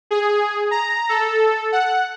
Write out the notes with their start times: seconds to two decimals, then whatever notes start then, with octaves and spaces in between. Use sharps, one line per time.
0.11 G#4
0.71 A#5
1.09 A4
1.72 F#5